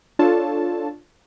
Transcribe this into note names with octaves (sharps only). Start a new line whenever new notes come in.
D4 F4 A4 C#5 A5